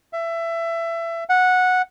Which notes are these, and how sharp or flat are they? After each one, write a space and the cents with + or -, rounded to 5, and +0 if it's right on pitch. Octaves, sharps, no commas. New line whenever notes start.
E5 +20
F#5 -10